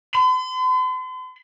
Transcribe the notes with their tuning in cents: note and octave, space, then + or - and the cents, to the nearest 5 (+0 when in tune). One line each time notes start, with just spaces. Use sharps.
C6 -45